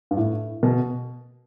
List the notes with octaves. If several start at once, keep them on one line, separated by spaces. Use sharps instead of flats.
G2
A2
B2